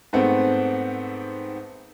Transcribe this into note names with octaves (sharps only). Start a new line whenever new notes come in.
G#2 A3 B3 C4